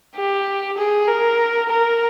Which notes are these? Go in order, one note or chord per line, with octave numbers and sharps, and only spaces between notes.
G4
G#4
A#4
A#4